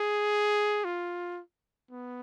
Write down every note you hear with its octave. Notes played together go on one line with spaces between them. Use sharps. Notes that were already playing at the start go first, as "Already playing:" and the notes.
Already playing: G#4
F4
B3